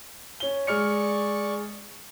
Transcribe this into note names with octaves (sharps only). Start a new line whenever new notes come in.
C#4 G7
G#3 D5 C#6 F6 C#7